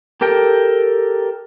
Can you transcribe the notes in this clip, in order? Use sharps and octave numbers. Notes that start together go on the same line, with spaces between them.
G4 A4 A#4 G5